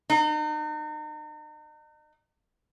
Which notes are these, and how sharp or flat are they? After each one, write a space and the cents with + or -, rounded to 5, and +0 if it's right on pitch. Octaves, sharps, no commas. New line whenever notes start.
D#4 -40